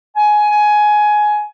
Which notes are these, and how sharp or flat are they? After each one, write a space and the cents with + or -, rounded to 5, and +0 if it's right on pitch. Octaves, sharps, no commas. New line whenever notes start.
G#5 +15